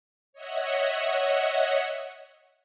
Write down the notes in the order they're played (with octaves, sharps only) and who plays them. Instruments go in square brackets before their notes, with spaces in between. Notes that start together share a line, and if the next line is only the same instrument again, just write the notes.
[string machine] C#5 D#5 E5 F#5